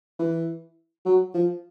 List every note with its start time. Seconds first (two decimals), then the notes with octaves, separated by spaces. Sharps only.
0.19 E3
1.06 F#3
1.34 F3